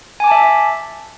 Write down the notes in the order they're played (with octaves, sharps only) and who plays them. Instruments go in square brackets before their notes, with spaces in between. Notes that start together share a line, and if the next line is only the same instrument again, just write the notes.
[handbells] G#5
D6
A5
E5